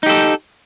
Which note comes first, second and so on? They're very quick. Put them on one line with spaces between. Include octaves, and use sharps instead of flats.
D#4 G4 A4